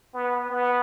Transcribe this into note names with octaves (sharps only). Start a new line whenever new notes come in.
B3
B3